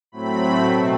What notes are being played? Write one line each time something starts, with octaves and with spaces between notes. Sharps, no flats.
A2 F#3 A3 C4 B5
B2 A3 C4